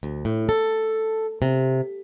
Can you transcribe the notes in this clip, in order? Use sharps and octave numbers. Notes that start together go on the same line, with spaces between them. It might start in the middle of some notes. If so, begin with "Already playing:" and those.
D2
A2
A4
C3